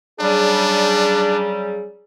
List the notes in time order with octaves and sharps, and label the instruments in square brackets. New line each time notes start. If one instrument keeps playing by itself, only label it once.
[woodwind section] C#3 F#3 G3 [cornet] D4 [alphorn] G#4